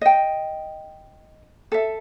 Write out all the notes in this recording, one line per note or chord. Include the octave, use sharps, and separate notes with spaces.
D#5 G5
A4 E5